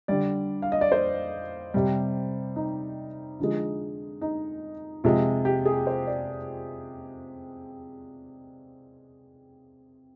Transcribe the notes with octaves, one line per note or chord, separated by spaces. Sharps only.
D3 G3 D5
F5
D#5
D5
C5
C3 G3
D#4
D3 F3 G#3
D#4
C3 F3 G#3 F4
G4
G#4
C5
D5